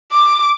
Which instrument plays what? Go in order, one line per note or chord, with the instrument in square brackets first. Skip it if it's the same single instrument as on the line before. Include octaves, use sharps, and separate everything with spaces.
[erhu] D6